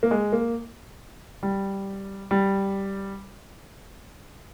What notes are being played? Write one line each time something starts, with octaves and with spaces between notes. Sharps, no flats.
A#3
G#3
A#3
G3
G3